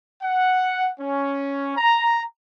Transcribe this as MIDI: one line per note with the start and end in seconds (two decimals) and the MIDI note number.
0.23 0.90 78
1.00 1.77 61
1.77 2.23 82